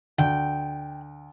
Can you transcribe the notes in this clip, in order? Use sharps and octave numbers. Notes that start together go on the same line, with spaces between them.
D2 G5